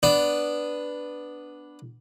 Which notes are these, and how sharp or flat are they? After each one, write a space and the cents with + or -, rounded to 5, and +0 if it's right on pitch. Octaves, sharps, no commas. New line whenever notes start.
B3 +0 D4 +0